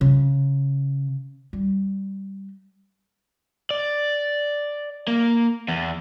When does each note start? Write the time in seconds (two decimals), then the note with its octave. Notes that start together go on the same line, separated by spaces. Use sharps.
0.01 C#3
1.53 G3
3.71 D5
5.08 A#3
5.68 E2